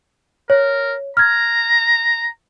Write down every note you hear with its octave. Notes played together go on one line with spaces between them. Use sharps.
A#4 C#5
A#5 F6 G#6